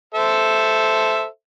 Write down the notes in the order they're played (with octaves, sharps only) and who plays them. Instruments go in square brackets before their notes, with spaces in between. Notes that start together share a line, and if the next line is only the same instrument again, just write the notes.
[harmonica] A4 C5 E5